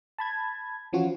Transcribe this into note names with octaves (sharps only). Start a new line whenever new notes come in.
A5 B5 G#6
E3 F3 C#4 F4 F#4